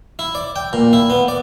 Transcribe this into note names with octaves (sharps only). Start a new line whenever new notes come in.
E4
D5
G5
A#2
E4
B3
D5